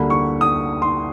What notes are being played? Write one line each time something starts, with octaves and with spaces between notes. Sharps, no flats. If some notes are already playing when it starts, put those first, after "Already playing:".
Already playing: D2 D3 G3 A#3 B5
C#6
D#6
C6